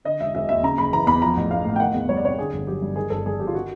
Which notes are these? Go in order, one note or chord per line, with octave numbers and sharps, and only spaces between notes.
D3 D#5
E1 E5
E1 E5
D#2 E5
C#3 A#5
F#1 B5
E3 A#5
E2 B5
F3 A#5
A1
A1 F5
A2
G5
D#3 F#5
E2
G3 C#5
D5
C3 C#5
D3 G#4
G1
F#3 G4
G2
D#3 G#4
G1 A4
G3 G#4
G2 G4
F4
D#3 F#4